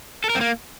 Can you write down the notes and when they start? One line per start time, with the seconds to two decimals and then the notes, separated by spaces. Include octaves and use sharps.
0.24 A4
0.30 A#4
0.35 C4
0.41 A#3